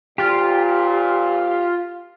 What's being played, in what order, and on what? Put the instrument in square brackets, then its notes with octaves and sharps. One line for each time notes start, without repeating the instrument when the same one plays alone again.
[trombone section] F2 A#2 [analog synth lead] F4 [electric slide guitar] G4